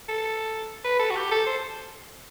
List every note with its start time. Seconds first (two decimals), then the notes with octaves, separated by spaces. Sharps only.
0.08 A4
0.84 B4
0.99 A4
1.10 F#4
1.16 G4
1.31 A4
1.46 C5